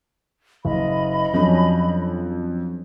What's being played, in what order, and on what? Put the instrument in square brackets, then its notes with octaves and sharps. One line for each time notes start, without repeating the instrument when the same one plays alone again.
[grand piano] F#1 [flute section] D#5 B5
[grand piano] F2 [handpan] F#3 C#4 D4